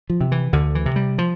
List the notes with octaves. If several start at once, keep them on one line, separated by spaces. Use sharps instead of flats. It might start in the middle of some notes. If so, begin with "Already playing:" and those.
F3
C3
E3
D2 D3
E3
C3
G3
F3